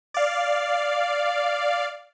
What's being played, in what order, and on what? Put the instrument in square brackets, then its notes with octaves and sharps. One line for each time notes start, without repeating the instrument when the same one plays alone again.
[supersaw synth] D5 F5